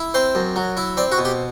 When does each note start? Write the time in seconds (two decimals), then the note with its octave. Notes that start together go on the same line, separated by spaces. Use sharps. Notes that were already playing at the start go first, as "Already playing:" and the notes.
Already playing: E4
0.14 C4 C5
0.35 F#2
0.56 F#3
0.77 E4
0.97 C4 D5
1.11 F#4
1.18 B2
1.25 G4